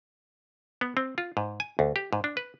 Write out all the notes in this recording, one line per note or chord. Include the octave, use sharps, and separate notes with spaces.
B3
C4
F4
G#2
G#5
D2
G4
G#2
D4
B4